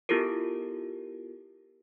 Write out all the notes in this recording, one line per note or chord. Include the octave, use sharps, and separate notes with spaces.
B3 E4 F4 G4 A4 A#4